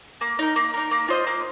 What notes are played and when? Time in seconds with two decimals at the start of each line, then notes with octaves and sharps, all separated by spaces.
0.21 A#3
0.39 D#4 A#4
0.56 A#3
0.74 D#4 A#4
0.91 A#3
1.08 F4 C5 D#5
1.27 A#3